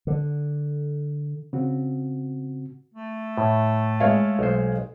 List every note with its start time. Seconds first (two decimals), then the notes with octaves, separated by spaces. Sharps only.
0.07 D3
1.53 C#3 C4 F#4
2.94 A3
3.37 A2
4.00 G#3 C#5 F5
4.39 B1 C5